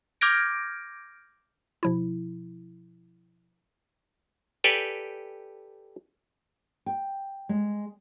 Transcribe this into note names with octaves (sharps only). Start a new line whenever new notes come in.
D6 F6 G6 G#6 A#6 D7
B2 F3 E4
G4 A4 B4 D5 G5 G#5
G5
G#3